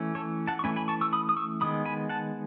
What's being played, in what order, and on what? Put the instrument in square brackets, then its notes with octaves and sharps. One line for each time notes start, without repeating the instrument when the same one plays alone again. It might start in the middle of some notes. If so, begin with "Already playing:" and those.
Already playing: [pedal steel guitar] E3 A3 C#4
A4 C#5
F#5 A5
C#6
E3 A3 C#4 G#5 B5
G#5 B5
A5 C#6
C#6 E6
B5 D#6
D#6
C#6 E6
D#3 G#3 B3 B5 D#6
G#5 B5
F#5 A5